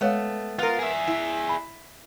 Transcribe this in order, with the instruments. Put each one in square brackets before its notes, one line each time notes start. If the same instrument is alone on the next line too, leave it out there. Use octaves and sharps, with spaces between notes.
[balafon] G#3 C#5 F5 [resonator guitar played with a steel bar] A3 B3
[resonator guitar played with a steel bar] B3 A#4 [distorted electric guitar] F4
[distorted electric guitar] G#4 E5
[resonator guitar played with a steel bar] E4
[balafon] B5